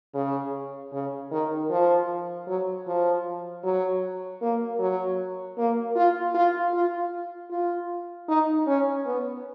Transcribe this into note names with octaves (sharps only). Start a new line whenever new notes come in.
C#3
C#3
D#3
F3
F#3
F3
F#3
A#3
F#3
A#3
F4
F4
F4
F4
D#4
C#4
B3